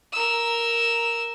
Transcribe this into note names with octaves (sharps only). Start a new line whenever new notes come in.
A#4 E6